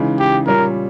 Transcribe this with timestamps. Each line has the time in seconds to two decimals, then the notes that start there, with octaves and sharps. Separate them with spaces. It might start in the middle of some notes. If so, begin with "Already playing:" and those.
Already playing: C#3 E3 G#3 D#4
0.19 G4
0.47 A#2 G3 C#4 A#4